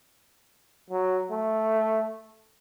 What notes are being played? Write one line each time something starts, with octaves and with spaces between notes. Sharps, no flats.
F#3
A3